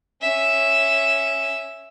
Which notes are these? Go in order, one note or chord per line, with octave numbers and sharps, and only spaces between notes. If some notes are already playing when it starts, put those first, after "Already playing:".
C#4 E5